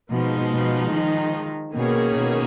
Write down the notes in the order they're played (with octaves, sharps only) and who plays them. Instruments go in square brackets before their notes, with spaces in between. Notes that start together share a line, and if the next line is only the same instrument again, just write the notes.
[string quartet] B2 [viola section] F3 G#3 D#4
[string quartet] B2
D#3
[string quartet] B2 [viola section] D#3 A#3 C#4 G#4 C#5
[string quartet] B2